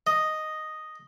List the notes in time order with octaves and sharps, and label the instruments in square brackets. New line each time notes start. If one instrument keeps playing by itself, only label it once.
[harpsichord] D#5